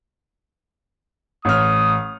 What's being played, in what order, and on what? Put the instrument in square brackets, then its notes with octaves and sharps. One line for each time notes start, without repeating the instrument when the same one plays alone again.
[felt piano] A1 F6 [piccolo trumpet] D#6